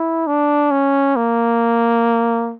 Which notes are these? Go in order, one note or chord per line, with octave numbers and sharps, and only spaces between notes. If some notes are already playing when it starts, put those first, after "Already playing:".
Already playing: E4
D4
C#4
A#3